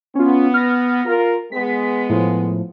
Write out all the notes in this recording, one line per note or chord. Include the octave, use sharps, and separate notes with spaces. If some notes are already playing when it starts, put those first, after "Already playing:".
B3 C#4 F4
F6 A#6
F4 A#4
G#3 B3 B6
A2 F3